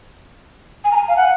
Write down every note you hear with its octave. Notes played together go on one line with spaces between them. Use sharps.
G#5
A#5
G#5
F5
F#5